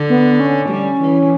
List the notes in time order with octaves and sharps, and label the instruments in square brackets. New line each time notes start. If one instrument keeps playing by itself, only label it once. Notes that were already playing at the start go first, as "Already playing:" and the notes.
Already playing: [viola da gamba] D3
[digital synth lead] B3
C#4
[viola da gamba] G3
E3